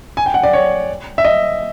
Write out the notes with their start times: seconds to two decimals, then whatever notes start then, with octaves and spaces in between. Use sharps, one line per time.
0.17 G#5
0.26 G5
0.34 F#5
0.43 D5
0.53 C#5
1.18 E5
1.25 D#5